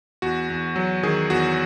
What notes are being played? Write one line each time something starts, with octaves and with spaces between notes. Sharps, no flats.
E2 F#4
E2
F#3
D#3 G#4
E2 F#4